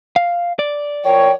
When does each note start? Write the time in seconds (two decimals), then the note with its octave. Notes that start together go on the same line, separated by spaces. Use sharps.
0.16 F5
0.59 D5
1.04 F3 A#4 C#5 G5